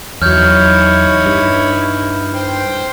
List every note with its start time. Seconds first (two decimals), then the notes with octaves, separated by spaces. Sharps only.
0.22 E2 F#3 D#4 E4 C#5 F6 G6
1.26 G2
2.34 C5 G5 C6